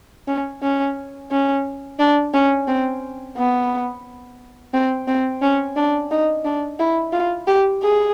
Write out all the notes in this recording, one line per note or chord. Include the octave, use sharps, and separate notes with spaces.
C#4
C#4
C#4
D4
C#4
C4
B3
C4
C4
C#4
D4
D#4
D4
E4
F4
G4
G#4